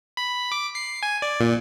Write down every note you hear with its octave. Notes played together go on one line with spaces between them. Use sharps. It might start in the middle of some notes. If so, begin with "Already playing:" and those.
B5
D6
C7
G#5
D5
A#2